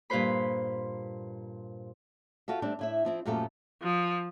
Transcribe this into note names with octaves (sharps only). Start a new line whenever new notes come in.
G2 A#2 F4 B4 C5 B5
F4 F#4 A4 E5
G3 A3 C4 D4
A2 E4 E5
F3 C4 E4
F#2 A#2 F3 A3 G4 A4
F3